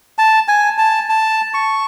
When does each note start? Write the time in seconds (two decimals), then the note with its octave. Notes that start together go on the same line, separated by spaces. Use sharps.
0.18 A5
0.48 G#5
0.78 A5
1.10 A5
1.54 C#6